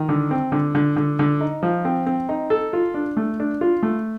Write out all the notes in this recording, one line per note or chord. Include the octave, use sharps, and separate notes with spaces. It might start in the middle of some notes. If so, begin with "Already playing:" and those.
Already playing: D#3
D3
C4
D3
D3
D3
D3
D#4
F3
C4
C4
D#4
A4
F4
D4
A3
D4
F4
A3